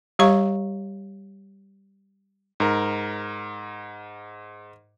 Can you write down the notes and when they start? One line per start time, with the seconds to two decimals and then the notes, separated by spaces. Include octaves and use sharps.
0.19 G3 G4 C#5 F5 A#5 C#6
2.60 G#2 A#4